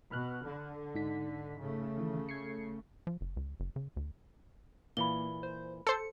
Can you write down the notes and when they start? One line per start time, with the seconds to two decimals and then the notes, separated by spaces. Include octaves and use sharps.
0.11 B2 B5 F6 F#6
0.45 D3
0.95 G#2 D#4 B6
1.61 C#3 A3
1.98 D#3 E3
2.29 G#6 C7 C#7
3.07 F3
3.21 F#1
3.37 C#2
3.60 F#1
3.76 C#3
3.96 D2
4.97 A#2 E3 A#3 B5 G7
5.43 C5
5.87 A4 C5 C#7